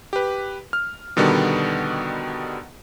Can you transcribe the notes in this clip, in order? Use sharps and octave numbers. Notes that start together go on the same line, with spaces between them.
G4 B4
F6
B2 D3 D#3 G3 B3